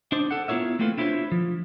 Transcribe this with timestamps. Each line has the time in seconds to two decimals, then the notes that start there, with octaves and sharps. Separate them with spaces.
0.12 D4 D#4 C5 D5
0.31 A4 F#5
0.48 B3 E4 F4 A#4 C#5 E5
0.79 A3 A#3 C4 F4 A4 B4
0.98 D4 E4 F4 G#4 C5 C#5
1.32 F3